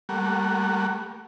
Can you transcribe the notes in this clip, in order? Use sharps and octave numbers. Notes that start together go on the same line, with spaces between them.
G3 A3 A#3 F#5